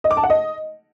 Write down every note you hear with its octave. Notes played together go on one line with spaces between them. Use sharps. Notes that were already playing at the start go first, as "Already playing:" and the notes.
D#5
D6
A5
F#5
D#5